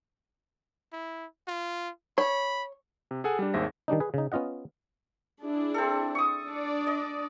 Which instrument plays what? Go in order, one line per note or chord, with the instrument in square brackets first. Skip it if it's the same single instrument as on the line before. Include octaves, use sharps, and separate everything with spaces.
[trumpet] E4
F4
[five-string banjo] C#5 [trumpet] B5
[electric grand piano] C3
G#4 A4 F#5 G#5
G3 D4
G#1 D#2 G#4 C5 E5 A#6
[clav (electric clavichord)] D#3 G3 D4 D#4
G#4 B4
C#3 D#4
B3 C#4 F4 D#5 F#5
[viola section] D4 E4 G#4
[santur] C4 A4
C#6 D#6
[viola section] D4 D5
[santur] D#5